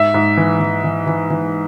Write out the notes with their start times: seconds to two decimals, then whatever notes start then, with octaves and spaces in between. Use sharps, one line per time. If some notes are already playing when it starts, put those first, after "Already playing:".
Already playing: G#2 E5
0.14 G#2
0.37 E3
0.60 E3
0.84 E3
1.07 E3
1.30 E3